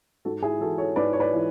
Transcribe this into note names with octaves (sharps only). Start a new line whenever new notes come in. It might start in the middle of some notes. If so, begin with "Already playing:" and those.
G#2 F#4 A4
E4 G#4
E3 F#4 A4
A4 C#5
G#2 B4 D5
C#5
B4 D5
E3